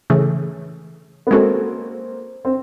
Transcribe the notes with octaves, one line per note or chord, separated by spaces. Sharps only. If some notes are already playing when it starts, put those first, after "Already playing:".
C#3 E3 A3
B3
G#3 A#3 C4 C#4 F#4 A4
C4